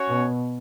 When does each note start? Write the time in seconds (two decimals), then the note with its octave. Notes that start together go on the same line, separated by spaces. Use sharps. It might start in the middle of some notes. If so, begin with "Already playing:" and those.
Already playing: C#4 F#4 C#5
0.08 B2